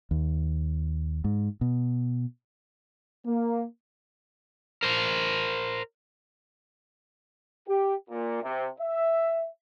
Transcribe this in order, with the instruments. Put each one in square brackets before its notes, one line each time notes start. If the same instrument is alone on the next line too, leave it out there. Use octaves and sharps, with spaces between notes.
[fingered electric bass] D#2
G#2
B2
[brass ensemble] A#3
[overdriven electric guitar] A#4 C5
[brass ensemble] G4
A#2
C3
E5